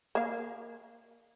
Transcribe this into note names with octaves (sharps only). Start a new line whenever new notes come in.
A#3 F5